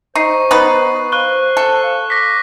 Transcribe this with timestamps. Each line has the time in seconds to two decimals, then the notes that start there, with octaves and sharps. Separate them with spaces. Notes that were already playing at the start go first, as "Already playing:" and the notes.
0.15 D#4 C5 C#6 C7
0.51 B3 D#4 B4
1.12 C5 F5 C#6 F#6 G7
1.57 A4
2.10 D6 A#6 B6